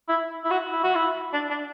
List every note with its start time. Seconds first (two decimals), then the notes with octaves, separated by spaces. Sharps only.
0.09 E4
0.44 E4
0.51 F#4
0.72 E4
0.83 F#4
0.95 E4
1.33 D4
1.50 D4